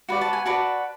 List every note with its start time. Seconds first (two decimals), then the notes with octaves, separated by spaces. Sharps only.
0.09 F#4 B4 D5 G5
0.21 A5
0.33 G#5
0.46 F#4 B4 D5 A5